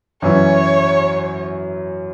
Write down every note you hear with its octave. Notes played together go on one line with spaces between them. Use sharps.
F#2 E3 C#4 E4 C#5